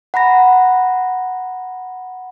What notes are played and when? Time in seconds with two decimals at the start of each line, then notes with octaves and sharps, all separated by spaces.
0.14 F#5 A#5 B5 A#6